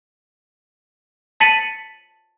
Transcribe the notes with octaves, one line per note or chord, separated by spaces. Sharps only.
A5 A6 B6 C#7 D#7 F#7